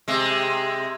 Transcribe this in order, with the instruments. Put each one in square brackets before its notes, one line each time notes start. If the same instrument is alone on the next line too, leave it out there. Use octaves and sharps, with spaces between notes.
[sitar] C3 G#3